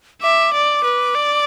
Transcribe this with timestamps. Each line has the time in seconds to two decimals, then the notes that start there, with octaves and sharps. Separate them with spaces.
0.22 E5 D6
0.54 D5
0.84 B4
1.15 D5